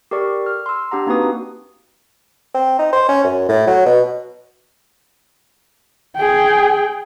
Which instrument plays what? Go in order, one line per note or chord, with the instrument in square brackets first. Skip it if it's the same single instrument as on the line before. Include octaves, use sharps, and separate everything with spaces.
[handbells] G4 A4 A#4 D5 C#6
F6
C6 E6
D4 G4 F#5 A#5
A#3 C4 D#4 F#4 B4 D#6
[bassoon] C4
D#4
C5
C#4
F#2
A2
F#3
B2
[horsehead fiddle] G#4 G5